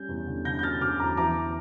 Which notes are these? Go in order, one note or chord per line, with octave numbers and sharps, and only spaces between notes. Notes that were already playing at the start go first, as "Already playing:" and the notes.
Already playing: G3 C#4 G6
E2
D3
D3 G6 A#6
G6
C#4 F6 A6
D3 D6 F6
E2 A#5 D6
E3 A#5 D6
C#4